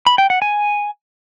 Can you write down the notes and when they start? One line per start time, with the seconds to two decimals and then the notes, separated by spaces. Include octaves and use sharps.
0.07 B5
0.18 G5
0.30 F#5
0.42 G#5